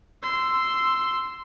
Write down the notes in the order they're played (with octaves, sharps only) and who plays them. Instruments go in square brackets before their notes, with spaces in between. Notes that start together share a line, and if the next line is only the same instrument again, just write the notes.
[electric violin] C6 E6